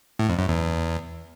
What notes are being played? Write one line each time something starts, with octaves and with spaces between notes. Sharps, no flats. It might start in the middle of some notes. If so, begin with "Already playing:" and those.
A2
F2
F#2
E2